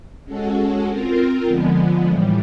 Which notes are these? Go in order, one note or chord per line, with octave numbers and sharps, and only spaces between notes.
G#3 C#4 F#4 A4
C4 F4 A#4
D3 F3 G#3 B3
A2 E3 G3